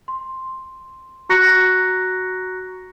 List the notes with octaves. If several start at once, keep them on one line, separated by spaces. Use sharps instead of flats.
C6
F#4 A#5 C#6 F#6 A#6 C#7